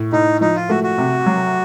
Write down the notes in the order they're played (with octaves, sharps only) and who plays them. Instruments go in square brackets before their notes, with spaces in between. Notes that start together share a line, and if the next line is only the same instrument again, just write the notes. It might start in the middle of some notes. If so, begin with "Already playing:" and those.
Already playing: [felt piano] A2
[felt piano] A2 [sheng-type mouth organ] D#4
[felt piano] F3 [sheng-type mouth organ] D#4
[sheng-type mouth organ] F4
[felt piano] A3 [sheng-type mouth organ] F#4
[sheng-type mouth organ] F#4
[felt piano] C3
F#3